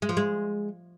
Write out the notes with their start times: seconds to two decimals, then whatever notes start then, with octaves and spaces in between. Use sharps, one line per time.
0.02 G#3
0.09 F3
0.17 G#3